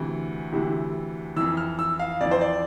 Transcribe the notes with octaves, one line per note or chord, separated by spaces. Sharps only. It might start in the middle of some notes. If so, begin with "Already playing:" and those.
Already playing: D2 C3 E3
D2 C3 E3
F2 E3 E6
F6
E6
F5
F2 E3 D5
C5
D5